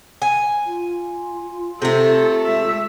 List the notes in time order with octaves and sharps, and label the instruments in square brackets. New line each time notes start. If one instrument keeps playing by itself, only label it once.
[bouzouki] G#5
[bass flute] F4
[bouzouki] C3 A3 [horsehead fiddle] A4
[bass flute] G#3 [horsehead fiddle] E5